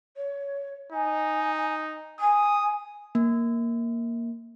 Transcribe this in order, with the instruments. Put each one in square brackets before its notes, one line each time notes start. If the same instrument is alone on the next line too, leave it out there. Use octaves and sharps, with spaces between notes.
[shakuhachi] C#5
[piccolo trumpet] D#4 [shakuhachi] G#5
[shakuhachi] G#5 [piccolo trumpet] D#6
[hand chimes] A#3